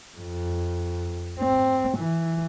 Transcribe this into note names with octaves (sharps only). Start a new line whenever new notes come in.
F2
C4
E3